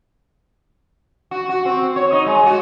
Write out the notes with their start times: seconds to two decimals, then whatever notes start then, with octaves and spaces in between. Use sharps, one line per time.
1.31 F#4
1.49 F#4
1.65 C4
1.96 C#5
2.12 D#4
2.26 G#3
2.46 F#4